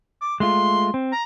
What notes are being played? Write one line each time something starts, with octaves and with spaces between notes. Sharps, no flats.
D6
G#3 A3 F4 C6
C4
A#5